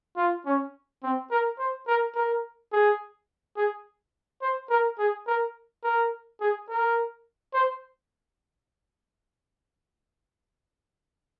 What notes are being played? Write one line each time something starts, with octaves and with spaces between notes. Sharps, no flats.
F4
C#4
C4
A#4
C5
A#4
A#4
G#4
G#4
C5
A#4
G#4
A#4
A#4
G#4
A#4
C5